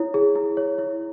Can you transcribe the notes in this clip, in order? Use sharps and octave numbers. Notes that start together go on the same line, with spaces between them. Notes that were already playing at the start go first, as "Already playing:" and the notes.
Already playing: E4 C#5
G#4
E4
C#5
E4